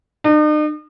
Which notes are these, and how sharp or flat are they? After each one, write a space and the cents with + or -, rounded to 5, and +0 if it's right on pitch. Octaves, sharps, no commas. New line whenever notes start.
D#4 -45